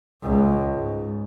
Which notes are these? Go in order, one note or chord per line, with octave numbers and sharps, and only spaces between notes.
C#2
G#2